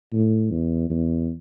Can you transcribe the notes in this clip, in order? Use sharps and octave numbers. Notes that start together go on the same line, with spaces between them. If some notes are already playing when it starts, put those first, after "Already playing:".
A2
E2
E2